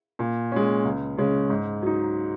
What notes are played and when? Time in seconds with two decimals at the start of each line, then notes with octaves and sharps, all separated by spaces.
0.19 A#2
0.52 G#3 C#4
0.85 C#2
1.17 C#3 G#3 C#4
1.50 G#2
1.82 F#3 D#4